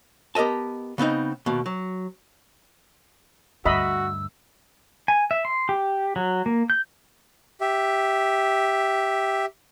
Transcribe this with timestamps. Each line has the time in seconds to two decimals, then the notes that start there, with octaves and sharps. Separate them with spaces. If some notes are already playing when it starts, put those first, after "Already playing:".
0.35 B3 G4 A#4 D#5 A5
0.98 C#3 B3 C4 D#4
1.46 D#2 B2
1.66 F#3
3.65 D2 G2 F#4 D#5 E5 B5 E6
5.08 G#5
5.31 E5
5.45 C6
5.69 G4
6.16 F#3
6.46 A#3
6.70 G6
7.61 G4 E5